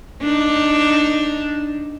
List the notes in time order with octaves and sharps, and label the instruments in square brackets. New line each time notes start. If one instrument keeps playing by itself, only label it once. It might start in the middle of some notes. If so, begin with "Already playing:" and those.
[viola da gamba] D4 D#4